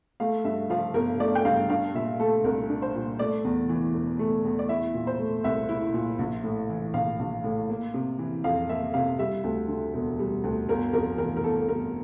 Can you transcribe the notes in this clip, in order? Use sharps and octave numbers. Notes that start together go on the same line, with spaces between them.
A3 F5
G2 E5
F3 F5
G1 A#4
A3 D5
G5
G2 F5
D4 F5
A#2 E5
A3 A4
C2 A#4
D4
C5
A#2
A3 D5
E2
E3
E1
A3
E2
D5
E4 E5
A#2
C5
A3
C2 E5
E4
A#2
A#1
A2
E3
A#1 F5
A#1
A2
A#3
C3
E3
F2 F5
A#3 E5
C3 F5
G3 E5
D2
D3
E1
G3
D2
G1 A#4
F2 A#4
E3 A#4
A#4
G1 A4
G1 A#4